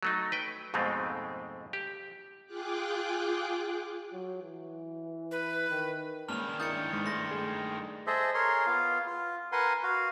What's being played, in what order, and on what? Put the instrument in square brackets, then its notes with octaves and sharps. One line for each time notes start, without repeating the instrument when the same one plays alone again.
[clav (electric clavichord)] F#3 A3 D#4
B4 G5
F2 G#2 B2 G#3 A3 C4
G4
[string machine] F4 G#4 G5 D6 F#6
[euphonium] F#3
E3
[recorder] B4
[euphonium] D#3
[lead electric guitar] G2 D#3 [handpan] G#3 A#3 C#4 [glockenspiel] F6 F7
[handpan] D4 E4 A#4 [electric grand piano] D#6 [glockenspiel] G6 A6 C#7
[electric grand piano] G#2 [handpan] G#3
[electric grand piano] A3 [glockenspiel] C6 A#6
[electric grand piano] A3 G#4
[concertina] G#4 A4 C5 D#5 E5
G#4 A#4 C#5 C6
B3 F4 F5
F4
A#4 B4 F#5 G#5 C6
F#4 F5